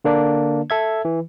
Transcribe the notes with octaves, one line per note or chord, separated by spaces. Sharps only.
D3 A#3 D4
A4 E5 G#6
E3